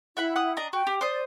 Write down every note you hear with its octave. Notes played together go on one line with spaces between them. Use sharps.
E4 E5 F#5 B5
F#5 D#6
D4 D#5 A#5
F#4 G5
G4
C5 D5 D#6